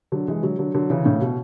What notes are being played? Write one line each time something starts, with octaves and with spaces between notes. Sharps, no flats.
D3 F#3
E3 G#3
D3 F#3
D3 F#3
D3 F#3
C#3 E3
A2 C#3
B2